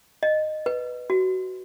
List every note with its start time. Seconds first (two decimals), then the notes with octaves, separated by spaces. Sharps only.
0.23 D#5
0.66 B4
1.10 F#4